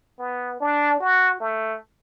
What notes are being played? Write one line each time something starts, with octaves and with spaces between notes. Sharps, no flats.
B3
D4
F#4
A3